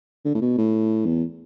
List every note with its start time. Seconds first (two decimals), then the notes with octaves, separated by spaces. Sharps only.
0.25 D3
0.35 A2
0.42 B2
0.58 A2
1.06 E2